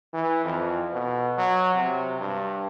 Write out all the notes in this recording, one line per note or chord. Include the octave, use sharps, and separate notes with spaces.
E3
F2
B2
F#3
C3
G2